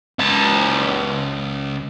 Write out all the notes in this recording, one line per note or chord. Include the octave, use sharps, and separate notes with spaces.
C#2 A5